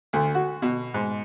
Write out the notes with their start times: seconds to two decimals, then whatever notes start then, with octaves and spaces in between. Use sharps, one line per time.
0.13 D2
0.35 F#4
0.62 B2
0.94 G#2